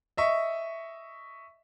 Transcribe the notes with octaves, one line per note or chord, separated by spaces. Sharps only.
D#5 E5 C#6